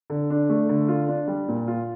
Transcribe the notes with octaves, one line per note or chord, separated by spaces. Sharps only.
D3
D4
A3
D3
F4
D4
G3
A#2
F4